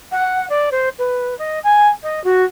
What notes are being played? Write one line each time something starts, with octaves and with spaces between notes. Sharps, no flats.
F#5
D5
C5
B4
D#5
G#5
D#5
F#4